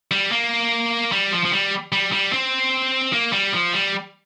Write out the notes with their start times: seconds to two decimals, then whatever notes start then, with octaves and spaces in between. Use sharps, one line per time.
0.11 G3
0.32 A#3
1.12 G3
1.32 F3
1.45 F3
1.52 G3
1.92 G3
2.12 G3
2.33 C4
3.13 A#3
3.33 G3
3.53 F3
3.73 G3